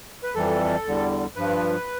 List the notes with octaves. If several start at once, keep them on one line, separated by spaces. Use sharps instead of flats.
B4
F2 E3 G3 A4
E2 D3 G3
G2 F3 B4